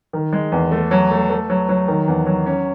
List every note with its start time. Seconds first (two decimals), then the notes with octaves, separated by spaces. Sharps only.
0.13 D#3
0.33 G#3
0.52 E2
0.71 A3
0.91 F#3
1.11 A3
1.30 A3
1.50 F#3
1.69 F#3
1.88 D#3
2.08 E2
2.26 F#3
2.46 C#4